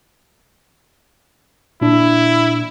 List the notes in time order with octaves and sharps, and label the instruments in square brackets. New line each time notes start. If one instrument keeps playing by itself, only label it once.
[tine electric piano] A#2 D4 [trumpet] E4